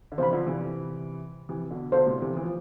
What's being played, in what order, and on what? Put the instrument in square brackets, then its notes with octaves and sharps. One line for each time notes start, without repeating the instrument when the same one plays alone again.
[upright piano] D3
[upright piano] C3 E3 [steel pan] C5 F5 B5
[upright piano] D3 F3
C3 E3
C3 E3
B2 D3
[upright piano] B2 D3 [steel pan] A4 C5 F5
[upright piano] A2 C3
C3 E3
E3
F3